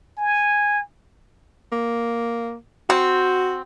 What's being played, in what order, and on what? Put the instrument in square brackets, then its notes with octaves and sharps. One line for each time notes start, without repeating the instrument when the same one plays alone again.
[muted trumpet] G#5
[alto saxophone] A#3
[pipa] C4 [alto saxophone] F#4